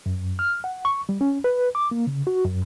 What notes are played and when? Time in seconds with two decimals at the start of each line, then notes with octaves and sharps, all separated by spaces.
0.06 F#2
0.39 F6
0.64 F#5
0.85 C#6
1.09 G3
1.21 C#4
1.44 B4
1.75 D6
1.91 A#3
2.07 C#3
2.27 F#4
2.44 F#2